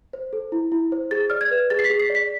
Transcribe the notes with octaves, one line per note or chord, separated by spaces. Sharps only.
C5
A4
E4
E4
C5
G#4 A6
D5 F6
G#6
B4
G#4 A6
C7
B6
G#4
C7
D5
B6